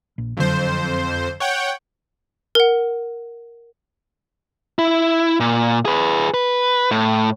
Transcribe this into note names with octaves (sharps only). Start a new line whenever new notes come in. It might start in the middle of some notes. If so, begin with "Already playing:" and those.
A#1
F#1 F2 D3 F#3 C5
C#5 F#5 G5
A#4 F#5
E4
A#2
G#4 B4
B4
A2